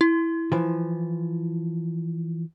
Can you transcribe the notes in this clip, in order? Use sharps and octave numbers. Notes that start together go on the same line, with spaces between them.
E4
E3 F3